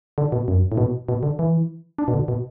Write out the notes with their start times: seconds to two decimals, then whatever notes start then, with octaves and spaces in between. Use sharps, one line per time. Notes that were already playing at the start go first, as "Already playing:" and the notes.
0.18 D3
0.32 B2
0.48 F#2
0.72 A2
0.78 B2
1.09 B2
1.23 D3
1.39 E3
1.98 D4
2.08 B2
2.14 D3
2.28 B2